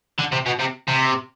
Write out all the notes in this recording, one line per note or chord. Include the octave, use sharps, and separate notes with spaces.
D3
C3
B2
C3
C3